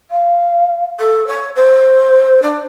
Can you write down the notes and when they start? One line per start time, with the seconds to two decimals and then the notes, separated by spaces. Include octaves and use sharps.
0.10 F5
0.99 A4
1.27 C#5
1.55 C5
2.42 D4